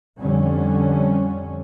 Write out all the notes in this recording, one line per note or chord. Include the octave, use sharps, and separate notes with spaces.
F2 D3 G3 C#4